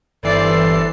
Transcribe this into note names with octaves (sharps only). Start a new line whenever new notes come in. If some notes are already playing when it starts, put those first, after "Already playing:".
G1 E3 A4 C5 D5 C7